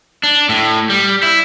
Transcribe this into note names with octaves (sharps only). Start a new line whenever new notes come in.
D4
A2
G3
E4